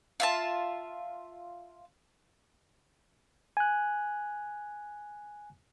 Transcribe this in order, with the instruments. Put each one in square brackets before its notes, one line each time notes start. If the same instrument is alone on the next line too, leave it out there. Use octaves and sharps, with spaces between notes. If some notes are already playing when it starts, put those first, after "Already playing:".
[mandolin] F4 E5 A5
[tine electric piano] G#5 F#6